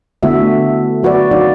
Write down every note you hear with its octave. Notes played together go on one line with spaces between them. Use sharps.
D3 A3 B3 E4 F#4 E5
F#3 F#4 B4 D5
F#3 D#4 F#4 D5 F5